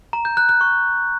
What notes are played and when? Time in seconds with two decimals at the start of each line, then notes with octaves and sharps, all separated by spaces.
0.13 A#5
0.25 G6
0.37 F#6
0.49 F#6
0.61 C#6